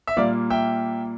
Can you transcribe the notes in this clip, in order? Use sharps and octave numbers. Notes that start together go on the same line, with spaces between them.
E5
A#2 G3 A#3 D5 F5
E5 G5